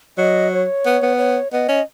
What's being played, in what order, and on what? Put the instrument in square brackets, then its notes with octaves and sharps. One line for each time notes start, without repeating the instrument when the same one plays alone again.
[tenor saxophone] F#3 [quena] D#5
[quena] C#5
[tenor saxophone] B3
B3
[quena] C#5
[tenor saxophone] B3 [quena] D#5
[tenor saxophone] C#4